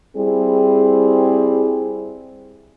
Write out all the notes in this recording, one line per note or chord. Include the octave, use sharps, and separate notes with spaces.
G3 C4 E4 G#4